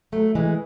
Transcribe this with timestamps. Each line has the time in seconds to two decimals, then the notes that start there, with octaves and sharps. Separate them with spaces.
0.12 F#3 A3
0.35 E3 G#3